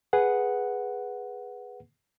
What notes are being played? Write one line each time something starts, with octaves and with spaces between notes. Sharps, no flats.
G#4 B4 F#5